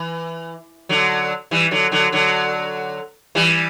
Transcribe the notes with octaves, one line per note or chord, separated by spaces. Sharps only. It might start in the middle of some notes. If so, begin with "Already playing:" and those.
Already playing: E3
D3 F#3
E3 G3
D3 F#3
D3 F#3
D3 F#3
E3 G3